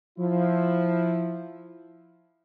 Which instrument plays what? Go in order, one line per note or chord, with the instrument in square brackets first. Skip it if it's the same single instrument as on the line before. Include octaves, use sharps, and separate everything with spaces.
[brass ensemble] F3 E4